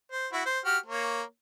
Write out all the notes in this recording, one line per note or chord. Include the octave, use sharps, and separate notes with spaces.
C5
E4 F#4
C5
F#4 G4 F6
A#3 C#5